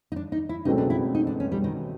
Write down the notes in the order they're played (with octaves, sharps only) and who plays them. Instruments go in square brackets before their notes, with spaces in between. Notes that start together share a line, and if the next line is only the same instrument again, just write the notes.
[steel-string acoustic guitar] D#4
D4
D#4
E4
[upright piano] C#2 B2 F#3 A3 C4 [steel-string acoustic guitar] D#4
[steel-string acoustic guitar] D4
E4
D#4
D4
C#4
G3
D#3